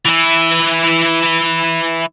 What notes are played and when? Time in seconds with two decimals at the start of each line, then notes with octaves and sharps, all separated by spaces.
0.05 E3 E4